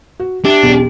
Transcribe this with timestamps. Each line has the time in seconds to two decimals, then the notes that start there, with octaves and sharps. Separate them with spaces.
0.20 F#4
0.45 D4 G4 E5
0.63 B1 E2